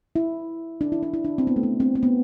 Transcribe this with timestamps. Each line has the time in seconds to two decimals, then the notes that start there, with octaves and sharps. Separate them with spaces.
0.16 E4
0.81 D4
0.92 E4
1.03 D4
1.14 E4
1.25 D4
1.38 C4
1.47 B3
1.56 A3
1.63 B3
1.80 C4
1.95 C4
2.03 B3